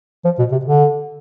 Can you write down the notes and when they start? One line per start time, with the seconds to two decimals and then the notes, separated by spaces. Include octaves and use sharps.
0.25 F3
0.39 B2
0.52 C3
0.65 D3